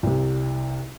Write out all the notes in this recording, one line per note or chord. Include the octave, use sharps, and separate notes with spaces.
C2 C3